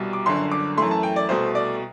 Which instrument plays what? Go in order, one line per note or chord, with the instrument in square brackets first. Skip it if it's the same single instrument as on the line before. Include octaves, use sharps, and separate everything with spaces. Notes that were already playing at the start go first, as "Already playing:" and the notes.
Already playing: [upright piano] C2 B2 G3
D6
G1 F#2 D3 C6
D6
F#2 E3 A3 C6
A5
G5
D5
C2 B2 A3 C5
D5